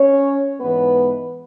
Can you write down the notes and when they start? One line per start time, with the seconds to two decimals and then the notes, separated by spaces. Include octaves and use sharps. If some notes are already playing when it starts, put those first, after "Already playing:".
Already playing: C#4 C#5
0.61 G#2 E3 G#3 B3 B4